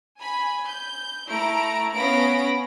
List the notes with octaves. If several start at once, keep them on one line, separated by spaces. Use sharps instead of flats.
G#5 B5
G6
A3 E4 A#5 D7
B3 C#4 F5 B5 A#6 D7